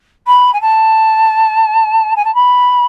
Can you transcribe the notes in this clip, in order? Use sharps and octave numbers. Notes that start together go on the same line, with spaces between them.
B5
G#5
A5
G#5
A5
B5